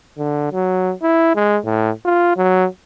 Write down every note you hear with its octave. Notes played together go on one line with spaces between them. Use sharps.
D3
F#3
E4
G#3
A2
F4
F#3